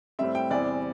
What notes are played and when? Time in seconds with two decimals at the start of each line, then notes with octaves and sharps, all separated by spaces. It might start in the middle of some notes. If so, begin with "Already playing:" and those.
0.19 A2 G3 C4 E5
0.35 G5
0.50 E2 C3 E3 G3 C4 D5